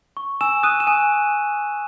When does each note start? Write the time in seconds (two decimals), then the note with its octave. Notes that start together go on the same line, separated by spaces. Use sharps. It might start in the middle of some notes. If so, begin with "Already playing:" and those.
0.17 C#6
0.41 G#5 E6 E7
0.63 D#6 F#6 D#7
0.80 E7
0.87 G#5 D#6 D#7